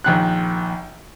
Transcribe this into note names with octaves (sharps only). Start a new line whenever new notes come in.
A#1 D#3 F#6